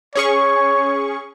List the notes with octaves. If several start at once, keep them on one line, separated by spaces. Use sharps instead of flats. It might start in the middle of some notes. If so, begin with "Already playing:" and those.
C#4 G#4 C#5 C#6